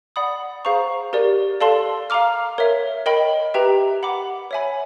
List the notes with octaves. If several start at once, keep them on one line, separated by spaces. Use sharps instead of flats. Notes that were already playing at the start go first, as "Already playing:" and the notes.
D5 F#5 B5 D#6
G#4 C5 F5 A#5 C#6
G4 A#4 D5
A4 D5 F5 A5 C6
F5 A#5 D6 F6
A#4 C#5 E5
A#4 D#5 G5 B5
G4 B4 E5 G5 A#5
F#5 B5 D6
C#5 E5 G#5 B5